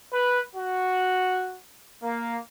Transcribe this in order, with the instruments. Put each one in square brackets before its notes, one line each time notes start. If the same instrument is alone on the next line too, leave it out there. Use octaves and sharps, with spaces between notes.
[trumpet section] B4
F#4
A#3